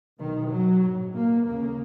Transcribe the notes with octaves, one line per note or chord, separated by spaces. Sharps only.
B1 B2 D#3
F#3
A#1 G#2
A#3
D#2 C#3 A#3